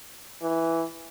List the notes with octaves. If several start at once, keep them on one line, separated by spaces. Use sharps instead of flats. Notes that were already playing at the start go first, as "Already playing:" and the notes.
E3